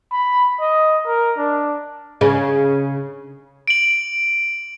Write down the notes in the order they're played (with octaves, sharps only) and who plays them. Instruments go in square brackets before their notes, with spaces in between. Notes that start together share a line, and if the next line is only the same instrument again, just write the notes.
[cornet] B5
D#5
A#4
D4
[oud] C#3
[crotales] D7 F#7